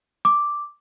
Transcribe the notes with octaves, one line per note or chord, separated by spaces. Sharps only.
D6